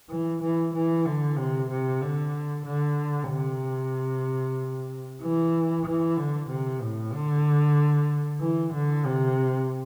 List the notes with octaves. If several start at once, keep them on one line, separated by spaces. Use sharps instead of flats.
E3
E3
E3
D3
C3
C3
D3
D3
C3
E3
E3
D3
C3
A2
D3
E3
D3
C3